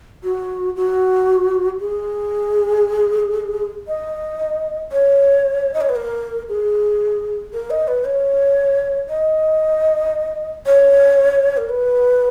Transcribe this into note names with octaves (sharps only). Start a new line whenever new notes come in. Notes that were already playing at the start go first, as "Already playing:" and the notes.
F#4
F#4
G#4
D#5
C#5
D#5
C#5
B4
A#4
G#4
A#4
D#5
B4
C#5
D#5
C#5
A#4
B4